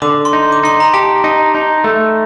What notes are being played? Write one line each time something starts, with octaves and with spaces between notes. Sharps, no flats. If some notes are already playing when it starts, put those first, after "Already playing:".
D3 D6
C6
D#4
D6
D#4 C6
A#5
G4 A5
D#4
D#4
A3